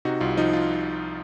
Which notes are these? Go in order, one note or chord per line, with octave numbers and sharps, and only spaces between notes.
C3 D#4 F#4
C2 F4
F3 D#4
F4